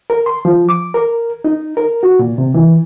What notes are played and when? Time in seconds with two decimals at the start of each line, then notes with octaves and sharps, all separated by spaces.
0.10 A#4
0.26 C6
0.45 F3
0.69 D6
0.94 A#4
1.44 D#4
1.77 A#4
2.03 F#4
2.19 A#2
2.38 C3
2.54 E3